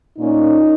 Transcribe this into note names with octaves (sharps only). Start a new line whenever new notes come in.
A#2 A#3 C#4 D#4